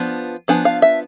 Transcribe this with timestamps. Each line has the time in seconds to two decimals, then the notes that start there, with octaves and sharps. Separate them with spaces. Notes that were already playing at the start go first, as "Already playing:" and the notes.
Already playing: F3 B3 D4
0.48 F3 B3 D4 G#5
0.65 F5
0.82 E5